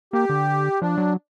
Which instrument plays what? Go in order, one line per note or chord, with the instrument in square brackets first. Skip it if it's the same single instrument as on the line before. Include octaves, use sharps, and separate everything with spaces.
[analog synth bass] A#3 [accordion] G4
[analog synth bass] D3
[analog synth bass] F3 [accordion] D4
[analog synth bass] F#3